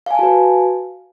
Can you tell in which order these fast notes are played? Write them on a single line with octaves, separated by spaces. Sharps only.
F5 G#5 A5 F#4 B4